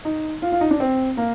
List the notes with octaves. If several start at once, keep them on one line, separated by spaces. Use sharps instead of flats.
D#4
F4
F4
D#4
D4
C4
A#3